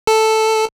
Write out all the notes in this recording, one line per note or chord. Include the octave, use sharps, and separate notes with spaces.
A4